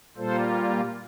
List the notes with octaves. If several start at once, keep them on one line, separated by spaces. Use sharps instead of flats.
A#2 G3 A#3 F4 A4 C5